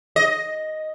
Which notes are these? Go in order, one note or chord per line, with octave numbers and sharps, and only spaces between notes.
D#5